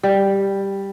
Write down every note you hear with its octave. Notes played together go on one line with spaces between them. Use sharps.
G3